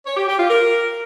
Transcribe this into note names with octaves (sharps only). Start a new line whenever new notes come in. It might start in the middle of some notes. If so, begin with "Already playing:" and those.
C#5
G4
G4
F4
A#4